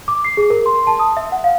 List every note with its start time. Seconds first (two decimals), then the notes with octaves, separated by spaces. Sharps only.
0.08 D6
0.25 C7
0.37 G#4
0.50 A#4
0.66 C6
0.87 A5
0.99 D#6
1.17 E5
1.32 F#5
1.44 F5